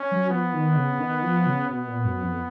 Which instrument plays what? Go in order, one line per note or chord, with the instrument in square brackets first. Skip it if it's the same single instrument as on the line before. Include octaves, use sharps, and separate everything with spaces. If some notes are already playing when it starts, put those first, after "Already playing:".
Already playing: [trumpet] C#4
[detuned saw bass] F#3
[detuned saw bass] F3 [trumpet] B3
[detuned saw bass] D#3
C#3
C#3
D#3
F3
C#3
[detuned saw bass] B2 [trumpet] B3
[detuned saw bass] A#2
F#2
F2